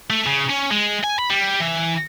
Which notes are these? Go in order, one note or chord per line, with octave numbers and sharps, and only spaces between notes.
A3
C#3
C#4
G#3
G#5
B5
G3
E3